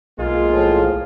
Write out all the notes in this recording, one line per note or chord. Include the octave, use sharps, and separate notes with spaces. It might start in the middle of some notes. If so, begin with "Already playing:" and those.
B1 G#3 A#3 F4
A2 F3